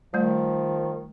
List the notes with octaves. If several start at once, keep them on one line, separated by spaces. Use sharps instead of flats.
D#3 F3 G3 A3